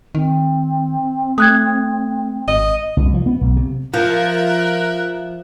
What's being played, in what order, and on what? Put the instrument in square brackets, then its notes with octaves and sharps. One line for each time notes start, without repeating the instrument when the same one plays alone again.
[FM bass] D#3 [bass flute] C4
[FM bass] A3 [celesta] D#6 F#6 G#6
[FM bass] G#1 [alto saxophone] D#5
[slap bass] C2
F3
B3
B1
C3
[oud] F3 [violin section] A#4 E5 [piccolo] F#6